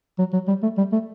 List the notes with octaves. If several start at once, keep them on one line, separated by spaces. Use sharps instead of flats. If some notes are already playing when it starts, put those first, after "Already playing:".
F#3
F#3
G3
A3
G3
A3